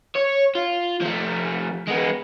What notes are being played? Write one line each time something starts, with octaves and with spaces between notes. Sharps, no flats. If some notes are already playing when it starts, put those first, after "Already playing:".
C#5
F4
F3 A3
G#3 B3